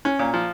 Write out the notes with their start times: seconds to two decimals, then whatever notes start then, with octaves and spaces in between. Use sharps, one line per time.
0.05 C#4
0.19 A#2
0.34 F3